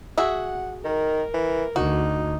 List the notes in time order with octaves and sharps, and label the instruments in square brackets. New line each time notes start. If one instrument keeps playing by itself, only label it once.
[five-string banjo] F#4 G#4 E5 [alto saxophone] F#5
[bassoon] D#3 [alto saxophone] A#4
[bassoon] E3
[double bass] D2 [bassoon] D#4 [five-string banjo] F#4